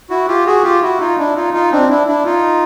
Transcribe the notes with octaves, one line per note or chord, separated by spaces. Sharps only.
E4 F#4
F4 G4
F#4 G#4
F4 G4
E4 F#4
D#4 F4
D4 E4
D#4 F4
D#4 F4
C4 D4
D4 E4
D4 E4
D#4 F4